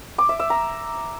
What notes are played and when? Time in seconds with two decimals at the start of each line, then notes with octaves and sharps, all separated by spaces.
0.18 D6
0.29 E5
0.40 E5
0.50 A#5